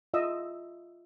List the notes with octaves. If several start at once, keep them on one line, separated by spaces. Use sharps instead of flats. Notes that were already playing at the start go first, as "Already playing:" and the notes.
F4 D#5 E5 E6